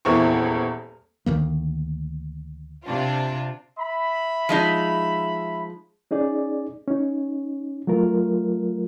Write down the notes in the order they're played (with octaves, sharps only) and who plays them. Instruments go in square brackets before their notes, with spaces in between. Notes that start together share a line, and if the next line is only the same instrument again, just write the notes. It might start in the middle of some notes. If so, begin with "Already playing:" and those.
[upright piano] D#1 E2 A#3 C4 E4 C#6
[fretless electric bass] D2 D#3 A#3
[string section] C3 D4 F4
[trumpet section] E5 B5
[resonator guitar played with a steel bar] F3 G#3 D#4
[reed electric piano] C#4 D#4 G#4 D5
C#4 D#4
F#3 A3 F4 A#4